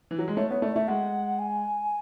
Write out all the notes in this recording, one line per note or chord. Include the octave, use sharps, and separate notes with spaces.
E3
F#3
G#3
A3 C#5
B3 C#5
A3 D5
A3 E5
G#3 F#5
G#5